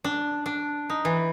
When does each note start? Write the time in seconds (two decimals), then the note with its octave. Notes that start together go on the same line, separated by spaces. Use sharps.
0.04 D4
0.46 D4
0.90 D#4
1.05 E3